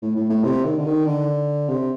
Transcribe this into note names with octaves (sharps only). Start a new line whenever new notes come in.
A2
A2
A2
C3
D#3
D3
D#3
D3
C3